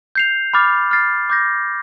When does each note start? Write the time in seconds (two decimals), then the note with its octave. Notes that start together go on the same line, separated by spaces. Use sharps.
0.15 G6 C7 F7
0.54 B5 D6 F6 A6
0.91 F6 A6 C7
1.30 D6 G6 A#6